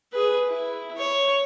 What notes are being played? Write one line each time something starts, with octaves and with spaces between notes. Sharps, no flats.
G#4 B4
E4
C#5